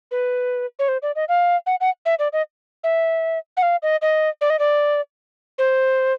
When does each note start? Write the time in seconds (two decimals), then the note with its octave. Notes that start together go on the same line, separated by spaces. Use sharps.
0.11 B4
0.79 C#5
0.88 C5
1.02 D5
1.16 D#5
1.29 F5
1.67 F#5
1.81 F#5
2.06 E5
2.19 D5
2.33 D#5
2.84 E5
3.57 F#5
3.63 F5
3.83 D#5
4.02 D#5
4.41 D5
4.50 D#5
4.59 D5
5.58 C5